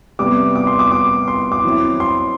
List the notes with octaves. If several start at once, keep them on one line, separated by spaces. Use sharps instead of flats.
C3 G3 B3 D6
D6
C6
D6
D6
C6
D6
F#3 C4 E4
C6